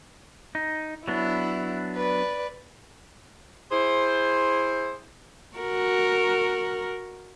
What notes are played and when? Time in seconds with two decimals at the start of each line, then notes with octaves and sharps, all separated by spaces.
0.55 D#4
1.08 F#3 B3 D4 E4
1.96 B4 D5
3.71 E4 G#4 C5
5.57 F#4 A#4